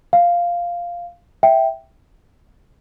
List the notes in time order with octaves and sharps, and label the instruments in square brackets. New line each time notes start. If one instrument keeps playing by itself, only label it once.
[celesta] F5
E5 G5